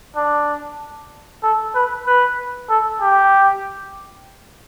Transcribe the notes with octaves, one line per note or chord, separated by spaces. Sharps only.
D4
A4
B4
B4
A4
G4